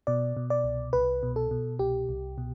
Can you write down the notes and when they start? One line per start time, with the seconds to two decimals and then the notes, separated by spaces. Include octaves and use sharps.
0.07 B2 D5
0.37 B2
0.50 D5
0.64 C2
0.93 C2 B4
1.23 B2
1.36 A4
1.51 B2
1.79 C2 G4
2.09 C2
2.38 B2